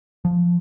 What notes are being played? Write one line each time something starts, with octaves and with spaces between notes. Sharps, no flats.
F3